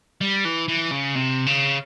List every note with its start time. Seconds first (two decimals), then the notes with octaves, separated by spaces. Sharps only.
0.21 G3
0.45 E3
0.69 E3
0.92 C#3
1.16 C3
1.46 C#3